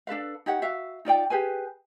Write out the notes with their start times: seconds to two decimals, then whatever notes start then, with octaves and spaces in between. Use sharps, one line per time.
0.07 D4 A4 B4 F5
0.46 D#4 G4 C#5 F#5
0.62 F#4 E5 F5
1.05 D#4 F4 D5 G5
1.30 G4 G#4 B4 G#5